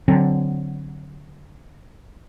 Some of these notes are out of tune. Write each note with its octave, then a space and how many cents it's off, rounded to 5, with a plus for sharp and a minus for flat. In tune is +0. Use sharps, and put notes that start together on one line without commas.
D3 -10 F#3 +0 C4 +5